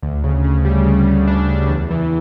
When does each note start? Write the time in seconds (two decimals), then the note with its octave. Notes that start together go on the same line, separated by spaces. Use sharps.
0.02 D2
0.24 C#3
0.44 C#3
0.65 G3
0.86 C#3
1.08 D2
1.27 D4
1.49 D4
1.69 E2
1.91 E3